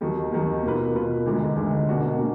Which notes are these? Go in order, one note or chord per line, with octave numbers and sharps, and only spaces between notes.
D#2 D#3 F#3
D#2 D#3 F#3
B2 A#3 F4 B4
B2 A#3 F4 B4
D2 D3 G#3 D#4
D2 D3 G#3 D#4
B2 A#3 D4 F#4
B2 A#3 D4 F#4